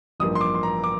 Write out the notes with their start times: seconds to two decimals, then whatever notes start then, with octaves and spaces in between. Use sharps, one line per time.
0.20 A1 G2 F3 A#3 D#6
0.35 C6
0.41 D6
0.55 C6
0.63 A#5
0.84 D6